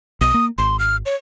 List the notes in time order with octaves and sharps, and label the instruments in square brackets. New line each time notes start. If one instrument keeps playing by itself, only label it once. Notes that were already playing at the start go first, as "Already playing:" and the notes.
[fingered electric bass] B1 [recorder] D#6
[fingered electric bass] A#3
[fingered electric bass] G#1 [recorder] C6
[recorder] F6
C#5